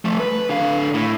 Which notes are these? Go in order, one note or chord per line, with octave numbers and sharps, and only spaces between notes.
F3 A3
B4
D3 F5
A2